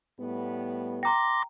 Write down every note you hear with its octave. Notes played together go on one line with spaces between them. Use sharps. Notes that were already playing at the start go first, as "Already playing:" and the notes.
A2 G3 B3
G5 A#5 C6 D6 A#6